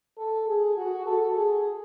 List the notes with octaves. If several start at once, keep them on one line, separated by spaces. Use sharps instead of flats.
A4
G#4
F#4
A4
G#4